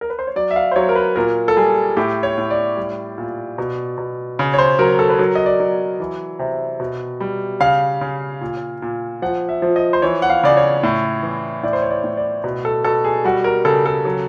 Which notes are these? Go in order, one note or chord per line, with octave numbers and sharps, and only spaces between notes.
A#4
B4
C5
C#5
F#3 D5
E5
F5
C5
F#3 C#5
A#4
B4
A#2 A#4
A4
G3 G#4
A2 G4
C#5
A2
D5
G3
A#2
B2
B2
C#3
C#5
C5
F#3 A#4
A4
B4
F#3 A#4
D#5
D5
F#3
E3
C3
B2
G3
C#3 F5
C#3
A#2
A#2
F3 F#5
E5
F3
D#5
C5
E3 C#5
F#5
F5
C#3 D5
C#5
A2
E3
A2 D5
C5
C#5
D5
A2
D5
B2
A4
B2 A4
G#4
G3 F#4
A#4
C#3 A4
A4
F#3